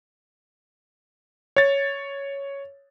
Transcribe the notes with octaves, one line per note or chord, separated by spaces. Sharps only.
C#5 A6